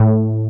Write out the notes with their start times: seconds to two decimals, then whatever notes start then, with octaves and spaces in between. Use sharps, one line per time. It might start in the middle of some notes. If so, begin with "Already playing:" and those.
Already playing: A2